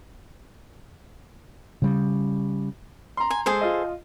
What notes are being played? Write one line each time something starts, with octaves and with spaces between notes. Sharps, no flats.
C#3 G3
A#5 C6
G#5
G#3 G#4 A4 C5
F4 D#5